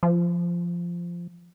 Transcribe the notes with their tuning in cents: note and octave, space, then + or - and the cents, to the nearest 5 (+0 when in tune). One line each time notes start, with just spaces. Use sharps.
F3 -10